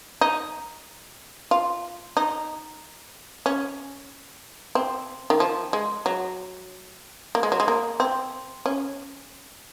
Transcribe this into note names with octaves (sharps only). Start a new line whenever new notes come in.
D#4
F4
D#4
C#4
C4
D#3
F3
G#3
F#3
A#3
G#3
F#3
G#3
A#3
C4
C#4